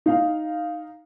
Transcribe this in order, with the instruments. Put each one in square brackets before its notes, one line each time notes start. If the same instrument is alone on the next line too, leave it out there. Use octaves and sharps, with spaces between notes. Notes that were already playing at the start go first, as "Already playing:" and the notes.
[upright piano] D#4 F5